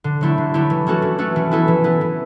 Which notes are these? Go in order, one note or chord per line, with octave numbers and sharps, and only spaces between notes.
D3
F#3 A3 E4 G4
D3
F#3 A3 E4 G4
E3
A3 C#4 F#4 A4
E3
A3 C#4 F#4 A4
E3
B3 E4 A4
E3
B3 E4 A4
E3